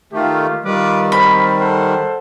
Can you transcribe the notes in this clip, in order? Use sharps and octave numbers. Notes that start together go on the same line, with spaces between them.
D#3 A3 F4 G4
D#3 G3 F4 B4 D6
C4 A#4 C5 B5
A4 C5 F#5